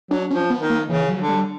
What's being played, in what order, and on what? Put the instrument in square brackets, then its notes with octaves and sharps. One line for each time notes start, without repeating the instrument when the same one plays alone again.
[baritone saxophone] F#3 [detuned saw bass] D4
[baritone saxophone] F3 [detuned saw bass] C#4
[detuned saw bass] B3
[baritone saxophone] D#3
[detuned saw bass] A#3
[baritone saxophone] C#3 [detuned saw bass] E3
[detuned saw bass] F#3
[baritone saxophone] D3
[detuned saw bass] G3